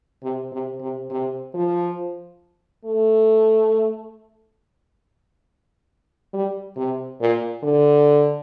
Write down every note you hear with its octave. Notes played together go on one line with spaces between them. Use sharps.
C3
C3
C3
C3
F3
A3
G3
C3
A#2
D3